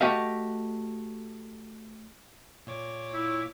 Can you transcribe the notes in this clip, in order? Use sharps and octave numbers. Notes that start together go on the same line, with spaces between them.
A3 F#4 G4 D#5 F5
A#2 C#5 D6
E4